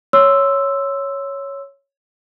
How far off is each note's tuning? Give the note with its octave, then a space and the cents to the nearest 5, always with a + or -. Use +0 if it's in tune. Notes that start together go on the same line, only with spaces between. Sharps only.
C#5 +0 C6 +0 E6 +0